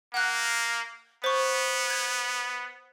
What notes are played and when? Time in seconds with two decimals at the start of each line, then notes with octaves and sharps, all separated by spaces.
0.14 A#3 F#5 F#6
1.24 B3 C5 C#6
1.87 F#6 G#6